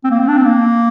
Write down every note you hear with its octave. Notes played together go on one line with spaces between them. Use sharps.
C4
A#3
C4
D4
C4
A#3